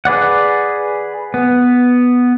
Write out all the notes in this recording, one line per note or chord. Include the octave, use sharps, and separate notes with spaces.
G#4 B4 D5 F#5
B3